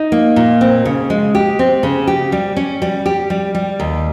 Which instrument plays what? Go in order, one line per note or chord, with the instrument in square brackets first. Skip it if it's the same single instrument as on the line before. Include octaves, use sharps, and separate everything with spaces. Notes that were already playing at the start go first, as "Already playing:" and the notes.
Already playing: [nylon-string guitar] D#4
A#3
A#2
C4
C#3
G#3
G4
C4
C#3
G4
G3
C#4
G3
G4
G3
G3
D#2